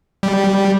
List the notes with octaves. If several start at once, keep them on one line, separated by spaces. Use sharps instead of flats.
G3